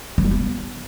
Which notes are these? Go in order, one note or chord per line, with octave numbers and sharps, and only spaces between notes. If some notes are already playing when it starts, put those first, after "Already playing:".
F#3
G3
B3